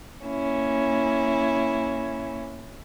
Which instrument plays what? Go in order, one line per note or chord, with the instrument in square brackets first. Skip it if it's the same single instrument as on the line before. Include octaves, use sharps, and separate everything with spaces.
[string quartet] A#3 C#4 E4